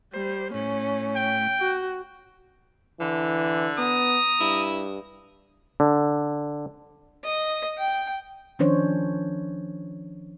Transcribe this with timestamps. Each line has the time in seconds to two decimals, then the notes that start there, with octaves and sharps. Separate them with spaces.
0.14 G3 C5
0.54 A2 C#4
1.16 G5
1.60 F#4
3.00 D3 E3
3.79 B3 A#5 D#6
4.41 G2 E4
5.80 D3
7.24 D#5
7.78 G5
8.59 D#3 F3 C#4 D4 C5 C#5